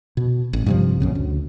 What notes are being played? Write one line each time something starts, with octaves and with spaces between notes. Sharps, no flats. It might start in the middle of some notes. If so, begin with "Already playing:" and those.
B2
A1
G2 C3 F3
A#1 F#2 C#3
D2